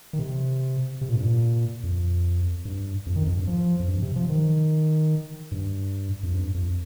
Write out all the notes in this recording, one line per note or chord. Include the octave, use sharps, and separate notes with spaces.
D#3
C3
C3
A#2
G2
A#2
F2
G2
F2
D#3
F2
G2
F3
F2
G2
C3
F3
D#3
G2
F2
G2
F2